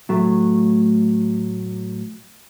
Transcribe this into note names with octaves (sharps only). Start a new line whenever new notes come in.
A2 F#3 A3